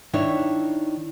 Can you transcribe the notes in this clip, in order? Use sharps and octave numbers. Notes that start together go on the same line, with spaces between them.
D#3 D4 E4 C#5